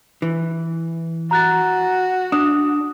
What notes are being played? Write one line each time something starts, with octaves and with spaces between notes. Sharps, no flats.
E3
F#4 A#5 F#6 A6
D4 D#6